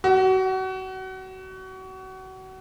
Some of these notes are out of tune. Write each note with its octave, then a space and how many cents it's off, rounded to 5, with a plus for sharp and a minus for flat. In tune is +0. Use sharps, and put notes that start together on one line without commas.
F#4 +30